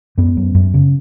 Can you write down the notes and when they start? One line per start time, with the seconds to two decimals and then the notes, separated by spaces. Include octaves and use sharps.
0.18 F#2 B3
0.37 F#2
0.55 F#2
0.74 C#3